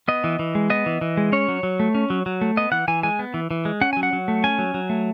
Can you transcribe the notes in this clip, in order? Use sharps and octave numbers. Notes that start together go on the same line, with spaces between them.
B3 D#5
E3
E3
G#3
B3 D#5
E3
E3
G#3
C#4 C#5
F#3
F#3
A3
C#4
F#3
F#3
A3
B3 D#5
E3 F#5
E3 G#5
G#3 G#5
B3
E3
E3
G#3
C#4 F#5
F#3 G#5
F#5
F#3
A3
C#4 G#5
F#3
F#3
A3